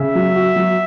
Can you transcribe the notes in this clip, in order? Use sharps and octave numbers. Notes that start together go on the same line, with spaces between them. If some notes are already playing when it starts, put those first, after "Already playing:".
Already playing: C#3 E5
F#3
F#4
F#3